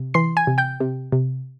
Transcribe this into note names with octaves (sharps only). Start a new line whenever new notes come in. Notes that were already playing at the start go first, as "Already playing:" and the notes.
Already playing: C3
E3 C6 C7
G#5 G#6
C3
G5 G6
C3
C3